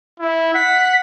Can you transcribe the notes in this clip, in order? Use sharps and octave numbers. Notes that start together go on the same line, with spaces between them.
E4
F#5 B6